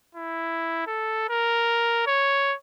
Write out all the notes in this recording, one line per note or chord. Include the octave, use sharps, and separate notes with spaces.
E4
A4
A#4
C#5